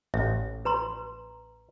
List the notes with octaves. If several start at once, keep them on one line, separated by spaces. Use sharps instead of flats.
A1 E5
B4 A#5 C6